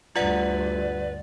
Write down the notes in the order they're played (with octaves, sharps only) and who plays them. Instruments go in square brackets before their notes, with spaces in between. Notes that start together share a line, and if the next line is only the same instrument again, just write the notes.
[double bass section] D2 G2 [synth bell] F4 F#5 [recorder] B4 [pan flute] D5